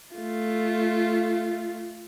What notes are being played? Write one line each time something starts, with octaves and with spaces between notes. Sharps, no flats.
A3 F4